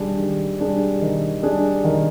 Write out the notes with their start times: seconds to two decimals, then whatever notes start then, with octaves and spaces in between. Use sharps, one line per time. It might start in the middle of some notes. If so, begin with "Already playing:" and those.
Already playing: D#3 G3 D4 G#4
0.18 D#3
0.60 G3 D4 G#4
1.02 D#3
1.43 G3 D4 G#4
1.84 D#3